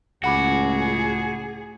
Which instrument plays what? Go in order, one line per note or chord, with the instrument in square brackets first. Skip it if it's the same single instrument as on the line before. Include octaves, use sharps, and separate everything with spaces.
[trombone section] C#2 [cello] A2 G#4 [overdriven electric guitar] F#4 [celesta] F#5 B5 D6